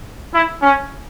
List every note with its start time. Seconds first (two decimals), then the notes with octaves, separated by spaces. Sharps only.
0.32 E4
0.61 C#4